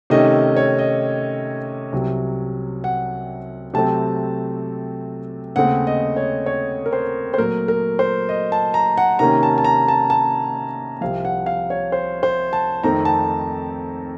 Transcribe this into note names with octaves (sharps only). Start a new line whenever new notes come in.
C3 D#3 A3 C#4 D#5
C#5
D#5
C2 C3 F#3
F#5
C3 F#3 A3 C4 A5
D#2 C#3 A3 C4 F#5
D#5
C#5
C#5
A#4
C5
C5
A#2 F#3 A3 A#4
A#4
C5
D#5
A5
A#5
F#5
C3 D#3 A#3 C#4 A#5
A5
A5
A#5
A5
A5
C2 C3 F3 F5
F#5
F5
C#5
C5
C5
A5
F2 D#3 A3 C4 A#5
A5